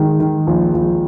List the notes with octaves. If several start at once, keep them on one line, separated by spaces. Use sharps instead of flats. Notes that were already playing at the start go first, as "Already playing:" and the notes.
Already playing: G#2 D#3 G#3
D#3
A#1
A#1